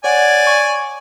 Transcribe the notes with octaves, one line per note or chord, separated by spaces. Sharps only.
C#5 D5 F#5 G#5
C#6